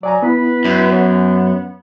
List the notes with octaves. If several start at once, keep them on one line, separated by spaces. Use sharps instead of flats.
F#3 D5 G#5 A#5
B3 E4 B4
F#2
B3 C#5